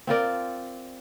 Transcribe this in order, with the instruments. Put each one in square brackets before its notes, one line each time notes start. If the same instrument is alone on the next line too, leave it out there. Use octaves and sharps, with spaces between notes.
[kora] C4 F4 A#4 D5